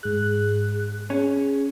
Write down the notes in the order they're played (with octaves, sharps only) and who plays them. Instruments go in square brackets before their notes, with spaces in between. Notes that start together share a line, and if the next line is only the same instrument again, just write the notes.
[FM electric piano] G#2 F#6 [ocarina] G#4
[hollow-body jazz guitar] C#4 [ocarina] G#4